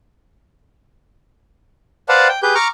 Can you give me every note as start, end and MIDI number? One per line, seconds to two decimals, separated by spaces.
2.09 2.28 71
2.09 2.28 72
2.09 2.28 74
2.09 2.28 77
2.09 2.28 78
2.09 2.28 81
2.29 2.40 79
2.43 2.55 67
2.43 2.55 68
2.43 2.55 71
2.43 2.55 91
2.55 2.68 82
2.55 2.68 85
2.55 2.68 86
2.55 2.68 89